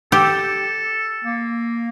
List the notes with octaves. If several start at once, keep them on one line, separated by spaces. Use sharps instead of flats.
G4 A4
A#3